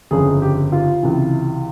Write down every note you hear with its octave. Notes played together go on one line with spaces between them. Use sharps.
G1 F2 C#3 G#4
G4
F4
C#2 C3 E3